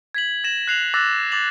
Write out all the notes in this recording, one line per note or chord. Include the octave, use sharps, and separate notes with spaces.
G#6 B6 F#7
G#6 A#6 E7 F#7
F#6 C7 F7 F#7
D6 E6 F#6 A6 A#6
D6 A6 F7 F#7